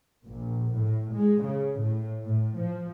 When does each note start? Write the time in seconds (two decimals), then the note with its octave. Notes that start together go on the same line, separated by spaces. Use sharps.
0.25 A#1
0.77 A2
1.13 G#3
1.43 C#3
1.79 A2
2.22 A2
2.58 F3